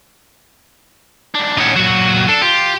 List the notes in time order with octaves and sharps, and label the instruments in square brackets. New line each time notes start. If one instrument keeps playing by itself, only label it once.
[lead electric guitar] G#2 D4
[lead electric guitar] A2 C#4 [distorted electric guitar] D#4 F#5
[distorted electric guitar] A#2 F#3 [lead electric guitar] F#4
[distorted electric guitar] D4 [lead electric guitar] A4
[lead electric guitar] F4 [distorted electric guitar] G4